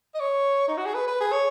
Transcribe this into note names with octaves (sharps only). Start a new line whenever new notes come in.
D#5
C#5
D#4
F#4
G#4
B4
B4
G#4
C#5